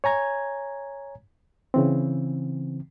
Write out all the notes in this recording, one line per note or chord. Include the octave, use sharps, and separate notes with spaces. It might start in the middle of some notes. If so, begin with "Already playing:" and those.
C#5 G#5 A#5 G#6
C#3 E3 C4